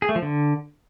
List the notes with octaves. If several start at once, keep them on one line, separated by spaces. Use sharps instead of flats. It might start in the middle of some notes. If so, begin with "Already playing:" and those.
G#4
A3
F3
D3